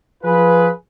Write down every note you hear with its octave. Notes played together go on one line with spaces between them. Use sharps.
F3 F4 G#4 B4